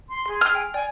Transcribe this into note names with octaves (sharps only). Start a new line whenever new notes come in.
C6
G#4 C6
E6 F6
G5 G#5
D5 G5 G#5